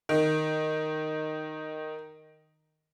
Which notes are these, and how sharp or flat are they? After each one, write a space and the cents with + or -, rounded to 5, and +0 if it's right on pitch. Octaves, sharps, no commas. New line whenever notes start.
D#3 -5